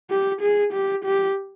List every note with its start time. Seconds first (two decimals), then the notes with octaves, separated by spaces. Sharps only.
0.10 G4
0.41 G#4
0.73 G4
1.05 G4